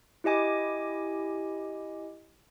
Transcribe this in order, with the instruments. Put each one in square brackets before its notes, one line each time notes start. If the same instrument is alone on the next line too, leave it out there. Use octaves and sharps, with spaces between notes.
[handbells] E4 G4 D#5 G#5 D6